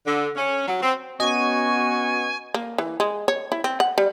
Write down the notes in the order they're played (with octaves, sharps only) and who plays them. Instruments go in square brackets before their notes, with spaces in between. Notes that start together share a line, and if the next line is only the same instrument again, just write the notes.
[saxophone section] D3
C#4
F#3
C4
[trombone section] B3 C#4 [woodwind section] F#4 C#6 [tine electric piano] D#5 [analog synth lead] G#5
[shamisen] A#3
E3
G#3
C#5
E4
C4
F#5
G3